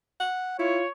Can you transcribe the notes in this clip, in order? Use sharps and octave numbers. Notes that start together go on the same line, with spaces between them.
F#5
E4 F4 C#5